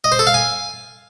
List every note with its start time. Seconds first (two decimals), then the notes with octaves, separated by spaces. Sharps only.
0.04 D#5
0.12 C5
0.19 A4
0.27 F5
0.34 G#5